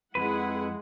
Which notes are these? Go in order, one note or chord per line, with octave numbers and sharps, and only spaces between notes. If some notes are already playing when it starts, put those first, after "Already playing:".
F2 G#3 E4 G#4 B4 F#5